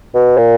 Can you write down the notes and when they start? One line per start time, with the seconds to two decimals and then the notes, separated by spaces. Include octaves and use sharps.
0.15 B2
0.38 A#2